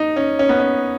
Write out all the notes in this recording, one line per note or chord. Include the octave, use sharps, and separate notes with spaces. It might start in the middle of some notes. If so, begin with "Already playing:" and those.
Already playing: D#4
C#4
C#4
B3
C#4